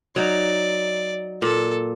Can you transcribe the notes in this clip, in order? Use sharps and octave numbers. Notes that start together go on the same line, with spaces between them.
F#3 D#4 D5
A#2 A4